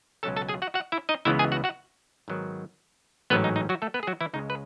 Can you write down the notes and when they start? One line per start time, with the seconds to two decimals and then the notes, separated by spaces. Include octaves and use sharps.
0.23 C#2 B2 F#3 C#4 A4 A5
0.36 A4 A5
0.49 G#4 G#5
0.62 F#4 F#5
0.74 F#4 F#5
0.92 E4 E5
1.09 D#4 D#5
1.25 C#2 C#3 E3 G#3 B3 E4 E5
1.39 G#4 G#5
1.52 F#4 F#5
1.64 F#4 F#5
2.28 G#2 D#3 F#3 B3
3.30 A1 G#2 F#3 B3 C#4 B4
3.44 D#4
3.56 D#4
3.69 F#3 F#4
3.82 A3 A4
3.94 B3 B4
4.03 G#4
4.07 F#3 F#4
4.21 E3 E4
4.33 C#2 C#3 G#3 D#4
4.50 B4